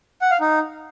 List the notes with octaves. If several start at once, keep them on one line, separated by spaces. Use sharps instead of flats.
F#5
F5
D#4